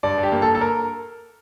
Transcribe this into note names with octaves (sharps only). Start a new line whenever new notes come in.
G2 D5
G2
G4
A#3
A4
G2
A4
A#4